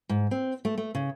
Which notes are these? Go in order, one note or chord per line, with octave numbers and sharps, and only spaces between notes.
G#2
C4
A3
A3
C#3